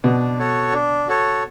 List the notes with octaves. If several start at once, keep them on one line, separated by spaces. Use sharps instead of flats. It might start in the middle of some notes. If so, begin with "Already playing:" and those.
B2 D4
F#4 A4 C#5
D4
F#4 A4 C#5